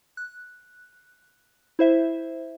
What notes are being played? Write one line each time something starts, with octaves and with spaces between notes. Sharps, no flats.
F#6
E4 C5 E5